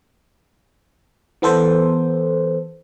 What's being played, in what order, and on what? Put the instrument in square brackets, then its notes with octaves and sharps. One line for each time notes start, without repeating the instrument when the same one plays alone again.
[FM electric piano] E3 B3 A4 C5